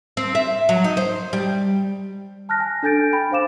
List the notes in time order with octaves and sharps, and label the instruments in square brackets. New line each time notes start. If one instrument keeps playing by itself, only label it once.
[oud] C4
E5
F#3
D#4
C5
G3
[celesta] A5 F6 F#6 A#6
G#5
D4 A4 G#5 G6 A6 D7
G5 B5 A6
D4 C5 F5 D6 E7